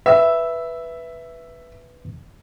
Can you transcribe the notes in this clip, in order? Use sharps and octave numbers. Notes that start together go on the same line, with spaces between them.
B4 E5 E6